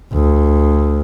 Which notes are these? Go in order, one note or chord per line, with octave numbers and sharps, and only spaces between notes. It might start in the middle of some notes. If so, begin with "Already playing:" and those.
D2